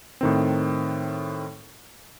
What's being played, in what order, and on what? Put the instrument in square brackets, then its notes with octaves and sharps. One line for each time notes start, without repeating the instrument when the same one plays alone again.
[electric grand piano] A2 D#3 C4